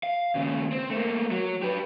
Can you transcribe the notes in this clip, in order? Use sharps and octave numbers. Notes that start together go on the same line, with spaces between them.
F5
D#2 C#3
C4
A3 A#3
F#3
G4 B4